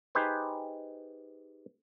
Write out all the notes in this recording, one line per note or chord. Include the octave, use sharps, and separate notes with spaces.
D#4 G4 G#4 B4 C5